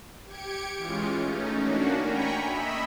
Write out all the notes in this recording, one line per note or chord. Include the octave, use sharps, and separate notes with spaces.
G4 G#6 C#7 D7
E3 G#3 C#4 F4
A3 C#4 D#4
A#3 C#4 D4 F#4
G5 G#5 A#5 B5 C#6
D#5 E5 B5 E6